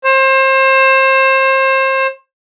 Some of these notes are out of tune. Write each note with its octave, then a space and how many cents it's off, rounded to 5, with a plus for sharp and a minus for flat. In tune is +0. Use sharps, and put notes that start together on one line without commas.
C5 +30